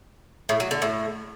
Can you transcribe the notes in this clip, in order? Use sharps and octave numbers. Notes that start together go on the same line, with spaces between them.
A2
F#3
D3
A2